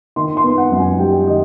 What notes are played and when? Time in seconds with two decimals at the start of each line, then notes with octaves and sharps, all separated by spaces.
0.16 D#3 C6
0.37 C6
0.43 B3
0.58 F#5
0.72 F#2
0.79 G#5
0.99 G3 G5
1.27 D#3 D#5